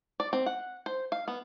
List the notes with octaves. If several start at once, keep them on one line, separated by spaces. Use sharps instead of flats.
D5
C4
F#5
C5
F5
B3